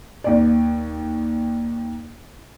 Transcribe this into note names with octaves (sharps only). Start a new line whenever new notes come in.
D#2 D5